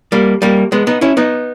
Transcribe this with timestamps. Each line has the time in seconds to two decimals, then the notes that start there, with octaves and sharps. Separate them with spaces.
0.12 G3 A#3
0.42 G3 A#3
0.72 G#3 B3
0.87 B3 D#4
1.01 C#4 E4
1.17 B3 D#4